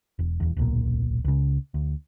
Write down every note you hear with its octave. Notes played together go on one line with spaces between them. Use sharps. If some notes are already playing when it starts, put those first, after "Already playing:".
E1
D#1 E2
D1 B1 A#2
C#2 C#3
D2